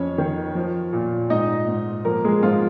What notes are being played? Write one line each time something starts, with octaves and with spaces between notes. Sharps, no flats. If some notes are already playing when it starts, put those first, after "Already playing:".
Already playing: F2 C#4 C#5
D#3
F3
A#2
G#2 D#4 D#5
G#2
F3 A#3 A#4
G#3 G#4
G#2 F3 F4